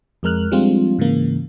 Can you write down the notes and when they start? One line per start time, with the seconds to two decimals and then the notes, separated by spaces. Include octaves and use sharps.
0.23 F2 G#3 A#4 F6 F#6
0.51 F3 G3 G#3 C4 D4 F4
0.98 G#2 C#3 E3 A#3